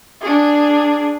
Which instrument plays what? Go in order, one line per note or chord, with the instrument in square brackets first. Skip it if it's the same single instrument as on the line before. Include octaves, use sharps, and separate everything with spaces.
[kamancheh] D4 G#4